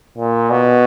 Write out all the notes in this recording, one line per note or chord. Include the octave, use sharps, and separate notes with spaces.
A#2
B2